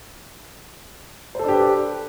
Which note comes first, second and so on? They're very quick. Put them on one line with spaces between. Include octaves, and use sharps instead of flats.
C5 A4 D4 G4 B4